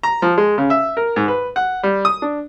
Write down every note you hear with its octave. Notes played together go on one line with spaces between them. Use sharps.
A#5
F3
G#3
C#3
E5
A#4
G#2
B4
F#5
G3
D#6
D4